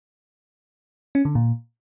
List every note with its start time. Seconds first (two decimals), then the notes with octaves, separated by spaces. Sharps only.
1.15 C#4
1.25 D3
1.35 A#2